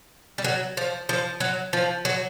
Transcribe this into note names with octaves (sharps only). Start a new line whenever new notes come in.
G3
F#3
F3
F3
F#3
F3
F#3